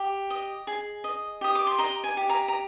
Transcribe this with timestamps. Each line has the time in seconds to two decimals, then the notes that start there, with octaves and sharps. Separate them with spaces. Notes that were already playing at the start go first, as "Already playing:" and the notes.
Already playing: G4
0.30 D#5
0.67 G#4
1.04 D#5
1.41 G4 D#6
1.55 D6
1.67 C6
1.79 D#5 A#5
2.04 G#5
2.17 G4
2.29 A#5
2.48 A#5